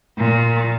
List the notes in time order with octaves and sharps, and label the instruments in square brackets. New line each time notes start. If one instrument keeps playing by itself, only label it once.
[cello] A#2